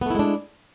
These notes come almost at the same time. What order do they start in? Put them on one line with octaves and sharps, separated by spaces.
B3 A3 E4 G#3 D4